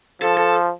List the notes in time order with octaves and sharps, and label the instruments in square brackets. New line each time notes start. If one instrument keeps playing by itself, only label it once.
[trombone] F3 [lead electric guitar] A4
[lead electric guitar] A4